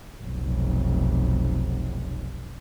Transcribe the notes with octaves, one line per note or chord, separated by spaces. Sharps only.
F1 B1